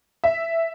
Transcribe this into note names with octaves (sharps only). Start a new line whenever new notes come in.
E5